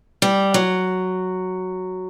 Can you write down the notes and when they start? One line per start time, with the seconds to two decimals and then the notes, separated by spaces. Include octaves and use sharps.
0.22 G3
0.54 F#3